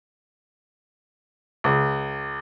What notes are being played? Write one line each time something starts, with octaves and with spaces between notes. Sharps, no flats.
C#2